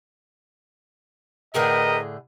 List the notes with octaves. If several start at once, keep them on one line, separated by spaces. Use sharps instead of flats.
A2 D3 G#4 A#4 B4 D#5 G5 A#5